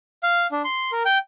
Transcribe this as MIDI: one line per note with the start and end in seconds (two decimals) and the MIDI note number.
0.23 0.47 77
0.52 0.62 62
0.64 0.91 84
0.92 1.03 70
1.05 1.18 79